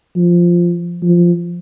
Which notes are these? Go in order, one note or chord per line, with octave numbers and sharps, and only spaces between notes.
F3
F3